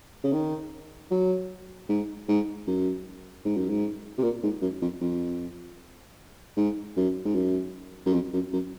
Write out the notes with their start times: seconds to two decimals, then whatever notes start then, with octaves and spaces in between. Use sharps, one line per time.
0.24 C#3
0.33 D#3
1.11 F#3
1.89 G#2
2.28 G#2
2.67 F#2
3.45 G#2
3.57 F#2
3.69 G#2
4.18 C3
4.23 A#2
4.43 G#2
4.62 F#2
4.82 F2
5.01 F2
6.57 G#2
6.96 F#2
7.25 G#2
7.35 F#2
8.06 F#2
8.13 F2
8.33 F#2
8.53 F#2